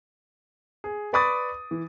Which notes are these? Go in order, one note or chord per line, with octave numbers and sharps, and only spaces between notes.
G#4
B4 D5 B5 C#6 D#6 A6
E3